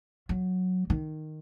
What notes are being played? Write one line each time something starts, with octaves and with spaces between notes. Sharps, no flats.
F#3
D#3